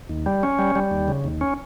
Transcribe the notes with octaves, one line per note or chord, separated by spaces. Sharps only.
D#2
G3
C#4
G3
G3
D#2
C#3
D#2
C#4